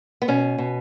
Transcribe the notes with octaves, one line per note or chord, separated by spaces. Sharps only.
B3
B2 C#4
B2